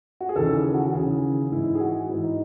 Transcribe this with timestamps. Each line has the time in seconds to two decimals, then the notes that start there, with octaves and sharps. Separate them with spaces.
0.21 F#4
0.29 G#4
0.36 D#2 C#3 E3 A4
0.55 G#4
0.74 F#4
0.87 F#4
0.93 D#2 C#3 E3 G#4
1.52 G#2 E3 E4
1.75 G#4
1.80 F#4
2.09 G#2 E3 E4
2.24 D#4